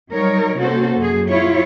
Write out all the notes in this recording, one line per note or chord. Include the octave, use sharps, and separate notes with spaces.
F#3 G3 D#4 A#4 C#5
C3 A#3 C#4 F#4 A4 C5
F#2 G#4
F#3 E4 F4 C#5